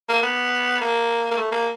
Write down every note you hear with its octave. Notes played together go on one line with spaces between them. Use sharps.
A#3
B3
A#3
A#3
A3
A#3